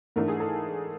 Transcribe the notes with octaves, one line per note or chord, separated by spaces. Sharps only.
G#2 E3 A3 D4 A#4
G#4
A4